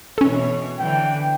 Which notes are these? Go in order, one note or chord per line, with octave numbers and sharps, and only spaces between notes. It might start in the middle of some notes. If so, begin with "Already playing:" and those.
B2 E3 C#4 A4 C#5
D3 E3 G5